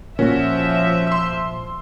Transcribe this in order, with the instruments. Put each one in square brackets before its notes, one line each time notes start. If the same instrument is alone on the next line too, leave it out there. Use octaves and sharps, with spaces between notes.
[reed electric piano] A#2 [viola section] F3 E5 [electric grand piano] C#4 F#4
[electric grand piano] C6 E6